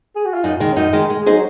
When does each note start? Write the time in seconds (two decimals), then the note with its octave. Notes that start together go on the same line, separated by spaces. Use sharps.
0.16 G#4
0.26 F#4
0.34 F4
0.44 F#2 D#4
0.60 D#3 G#3
0.72 C#4
0.76 F#2 D#4
0.93 D#3 G#3
1.10 G#3
1.20 G#3
1.26 F#3 D#4 G#4 C5